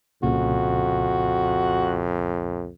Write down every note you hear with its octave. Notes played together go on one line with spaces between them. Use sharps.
C2 F2 A#2 C#3 F#4